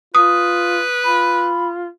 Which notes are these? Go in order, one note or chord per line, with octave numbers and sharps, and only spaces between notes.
F4 B4 D#6
F4 B5